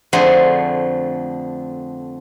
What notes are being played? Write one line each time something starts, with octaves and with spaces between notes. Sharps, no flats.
F2 D3 A3 G#4 C5